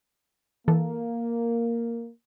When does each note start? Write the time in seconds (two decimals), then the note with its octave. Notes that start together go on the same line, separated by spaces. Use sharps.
0.68 E3 A#3 A4